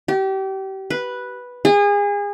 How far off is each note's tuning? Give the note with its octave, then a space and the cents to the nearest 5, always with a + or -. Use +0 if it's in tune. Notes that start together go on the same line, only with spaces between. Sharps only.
G4 -30
B4 -5
G#4 -30